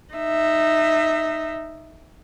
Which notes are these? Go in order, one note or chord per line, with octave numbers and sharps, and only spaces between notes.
D#4 E5